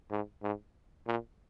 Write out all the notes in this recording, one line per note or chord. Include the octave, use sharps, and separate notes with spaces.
G#2
G#2
A#2